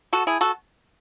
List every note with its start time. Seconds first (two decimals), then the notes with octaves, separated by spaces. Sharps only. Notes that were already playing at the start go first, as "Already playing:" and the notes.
0.13 F#4 A4
0.27 E4 G#4
0.41 F#4 A4